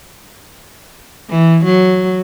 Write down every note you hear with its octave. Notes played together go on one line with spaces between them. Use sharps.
E3
F#3